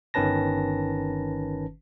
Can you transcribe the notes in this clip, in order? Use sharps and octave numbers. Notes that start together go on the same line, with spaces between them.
G1 D#3 C#4 B4 A5 A#6